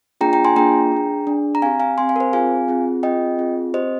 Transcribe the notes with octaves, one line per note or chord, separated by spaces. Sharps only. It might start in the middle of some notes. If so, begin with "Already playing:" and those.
A#3 D4 F4 G#4 G5 A#5
G5 A#5
G#5 C6
A#3 D4 F4 G#4 G5 A#5
D4 G#4
D4 G#4
A#5
C4 G4 F5 G#5
F5 G#5
C4 G4 G#5 C6
F5 G#5
A#4
C5
C4 F4 G#4 F5 G#5
C4 F4 G#4
C4 F4 G#4 D#5 G5
C4 F4 G#4
C4 G4 C5 D#5